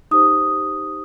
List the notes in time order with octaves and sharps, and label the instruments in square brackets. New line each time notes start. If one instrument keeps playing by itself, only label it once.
[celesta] D#4 G4 C5 D#6